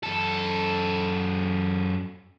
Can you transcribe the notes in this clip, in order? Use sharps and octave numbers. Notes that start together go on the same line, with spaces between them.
F#2 A4